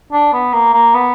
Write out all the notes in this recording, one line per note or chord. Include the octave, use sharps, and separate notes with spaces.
D4
B3
A#3
A#3
B3